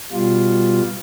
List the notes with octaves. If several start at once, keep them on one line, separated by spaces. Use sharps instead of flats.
B2 G3 F4